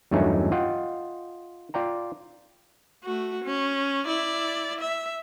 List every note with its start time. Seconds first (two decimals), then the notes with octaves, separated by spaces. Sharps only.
0.11 E2 G2 F#3 A3 C#4 D#4
0.52 F4 D#5 F#5 G5
1.74 F4 D5 G5 A#5
3.04 A3 F#4
3.44 C#4
4.06 E4 D5
4.81 E5